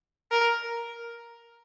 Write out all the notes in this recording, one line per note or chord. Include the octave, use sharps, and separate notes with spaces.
A#4